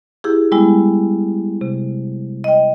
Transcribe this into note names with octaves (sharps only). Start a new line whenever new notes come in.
E4 G4 G#4
G3 G#3 B3 E4
C3
D#5 G5